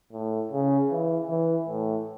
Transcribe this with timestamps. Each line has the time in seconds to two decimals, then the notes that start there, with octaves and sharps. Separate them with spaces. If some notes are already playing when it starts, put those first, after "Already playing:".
0.13 A2
0.52 C#3
0.91 E3
1.30 E3
1.68 A2